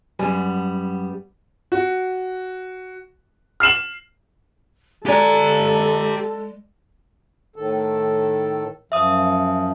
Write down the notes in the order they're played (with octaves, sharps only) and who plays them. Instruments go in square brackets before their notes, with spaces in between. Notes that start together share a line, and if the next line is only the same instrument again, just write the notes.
[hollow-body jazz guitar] F#2 G3 B3 G#5
[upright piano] F#4
F6 C7 E7 F#7
[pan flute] G#3 [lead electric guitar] G4 A#5 [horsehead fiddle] A4 [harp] D5 G#5
[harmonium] A2 D#3 A4
[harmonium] F#2 F3 [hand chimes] E5 D#6